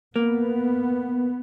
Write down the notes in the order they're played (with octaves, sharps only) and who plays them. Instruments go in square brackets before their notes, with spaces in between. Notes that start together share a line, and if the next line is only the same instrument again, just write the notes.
[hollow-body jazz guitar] A#3 [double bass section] B3